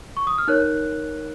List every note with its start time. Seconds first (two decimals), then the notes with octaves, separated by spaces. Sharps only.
0.17 C#6
0.27 D#6
0.38 F6
0.48 D#4 A#4 C#5 F#6